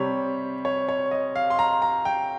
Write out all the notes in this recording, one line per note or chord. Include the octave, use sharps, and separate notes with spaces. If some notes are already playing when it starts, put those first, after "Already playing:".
Already playing: C3 G3 C#5
C#5
C#5
D#5
F5
C6
A#5
A#5
G5